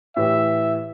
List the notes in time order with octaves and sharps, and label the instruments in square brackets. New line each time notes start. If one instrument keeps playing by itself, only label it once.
[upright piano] A2 E3 G4 [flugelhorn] E5